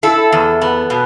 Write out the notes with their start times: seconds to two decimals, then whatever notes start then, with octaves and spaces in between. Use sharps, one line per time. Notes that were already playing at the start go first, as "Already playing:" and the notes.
0.03 E4 A4
0.32 E2
0.61 B3
0.90 B2